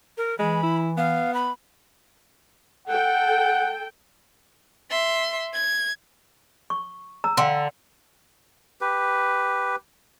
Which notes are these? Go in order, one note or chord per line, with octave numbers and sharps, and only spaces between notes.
A#4
E3 G#3 B5
E4
B3 F5
B5
A4 F#5 G5
E5 C6
G#6
C#6
A#5 E6
D3 F5 G5 C6
G4 B4